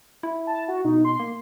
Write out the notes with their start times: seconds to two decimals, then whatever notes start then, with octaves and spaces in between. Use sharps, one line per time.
0.23 E4
0.47 A5
0.68 F#4
0.85 B2 D#4
1.05 C6
1.19 A#3